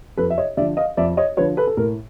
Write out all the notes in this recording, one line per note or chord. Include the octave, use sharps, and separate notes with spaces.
F2 A4 B4
E5
C#5 D#5
D3 F3 D5 E5
D#5 F5
F2 D5 E5
C#5 D#5
D3 F3 B4 C#5
A4 B4
A4
A2 A#4